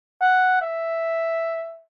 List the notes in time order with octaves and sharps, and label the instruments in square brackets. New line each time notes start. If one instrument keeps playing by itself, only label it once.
[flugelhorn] F#5
E5